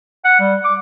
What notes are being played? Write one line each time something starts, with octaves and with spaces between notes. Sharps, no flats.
F#5
G3
D6